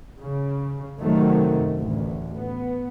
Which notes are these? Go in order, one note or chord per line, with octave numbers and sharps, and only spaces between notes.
C#3
F#2 C3 D#3 F#3 A3
A1 D2
B3